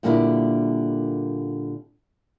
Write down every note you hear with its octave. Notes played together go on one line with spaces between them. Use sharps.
A#2 D3 G3 A#3 D4 E4